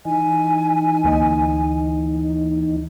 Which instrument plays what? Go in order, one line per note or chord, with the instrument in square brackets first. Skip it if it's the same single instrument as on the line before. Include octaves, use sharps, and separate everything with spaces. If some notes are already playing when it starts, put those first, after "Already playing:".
[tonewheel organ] E3 D#4 [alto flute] G#5
[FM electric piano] D2 A#3 D#5